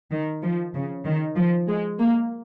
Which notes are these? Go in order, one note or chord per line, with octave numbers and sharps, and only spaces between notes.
D#3
F3
C#3
D#3
F3
G#3
A#3